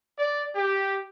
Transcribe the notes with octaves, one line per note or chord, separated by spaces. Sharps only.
D5
G4